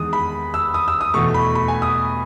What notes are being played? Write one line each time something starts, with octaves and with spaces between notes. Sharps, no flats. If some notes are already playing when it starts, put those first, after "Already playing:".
Already playing: E2 D#3 G#3 D#6
B5
E6
D#6
E6
D#6
E2 B2 A3 C#6
B5
B5
G#5
D#6